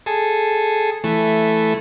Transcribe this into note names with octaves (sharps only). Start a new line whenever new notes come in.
G#4 A4
E3 A3